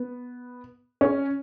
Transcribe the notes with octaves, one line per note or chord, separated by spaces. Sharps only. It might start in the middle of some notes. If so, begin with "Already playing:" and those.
Already playing: B3
C#4